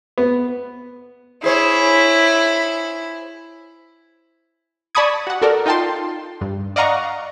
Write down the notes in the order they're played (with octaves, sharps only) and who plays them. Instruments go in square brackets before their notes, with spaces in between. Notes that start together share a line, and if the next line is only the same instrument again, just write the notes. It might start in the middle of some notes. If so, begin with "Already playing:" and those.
[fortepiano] B3
[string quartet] E4 [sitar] G#4 C5 C#5
[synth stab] D5 A5 B5 C#6 D#6 G#6
F#4 F#5
F#4 A4 A#4 D5
D#4 F4 G5 A5 C6
G2
D5 D#5 F5 F#5 A#5 C#6